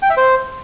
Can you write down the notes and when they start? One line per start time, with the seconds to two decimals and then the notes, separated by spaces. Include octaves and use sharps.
0.02 G5
0.10 E5
0.17 C5